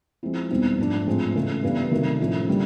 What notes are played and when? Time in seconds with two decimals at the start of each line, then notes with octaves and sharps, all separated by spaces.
0.23 F3 G#3 C4 E4
0.50 E2 B2 G3 C4 D#4
0.78 G#2 F3 A3 D4
1.06 A2 F3 G#3 C4 F4
1.34 C#3 E3 A3
1.63 G2 E3 G3 B3
1.91 C3 D#3 F#3 A3
2.20 A2 F3 A3 C#4 E4
2.48 D3 G3 A#3